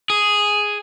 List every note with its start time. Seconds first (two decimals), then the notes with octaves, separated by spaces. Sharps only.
0.10 G#4